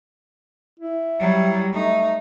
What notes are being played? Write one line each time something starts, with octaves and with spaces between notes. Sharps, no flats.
E4
F#3 G3
A3 D#4